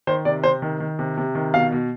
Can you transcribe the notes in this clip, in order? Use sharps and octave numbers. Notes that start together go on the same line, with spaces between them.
D#3 C5
C3 D5
C3 C5
D#3
D#3
C3
C3
D#3
B2 F5
B2